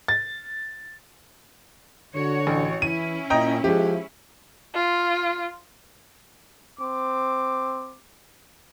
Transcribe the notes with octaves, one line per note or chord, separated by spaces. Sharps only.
A6
D3 F#4 C#5
A1
E3 C#4 E4 D#7
A#2 D#5 G5 A#5
F3 G#3 G4
F4
C4 D6